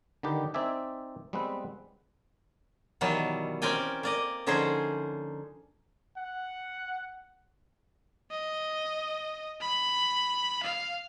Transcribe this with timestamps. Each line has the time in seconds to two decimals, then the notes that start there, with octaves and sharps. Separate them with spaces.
0.23 D3 D#3 D#4 G4 B4
0.54 C4 D#4 D5 E5 G#5
1.33 G3 G#3 B3 C4 B4
3.01 B2 D#3 E3 F#3 G3
3.62 C4 C#4 A#4 D5 G5 G#5
4.03 A#3 D5 D#5
4.47 D3 F3 C#4 D#4 G#4 C5
6.18 F#5
8.32 D#5
9.61 B5
10.63 F5